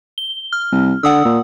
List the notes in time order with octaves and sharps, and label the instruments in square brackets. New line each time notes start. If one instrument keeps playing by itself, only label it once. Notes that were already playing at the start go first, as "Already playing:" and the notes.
[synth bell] G7
F6
[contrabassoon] C2
[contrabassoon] D3 [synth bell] F#5 D#6 E6
[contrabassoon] A#2